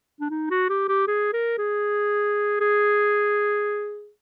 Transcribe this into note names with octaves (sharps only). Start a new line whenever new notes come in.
D4
D#4
F#4
G4
G4
G#4
A#4
G#4
G#4